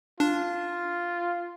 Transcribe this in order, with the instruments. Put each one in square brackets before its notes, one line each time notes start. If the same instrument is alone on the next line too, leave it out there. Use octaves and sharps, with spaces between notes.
[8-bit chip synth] D4 [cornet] F4